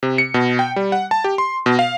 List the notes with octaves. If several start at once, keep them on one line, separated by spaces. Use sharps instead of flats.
C3
C#7
B2
G5
G3
F#5
A5
G4
C6
B2
F5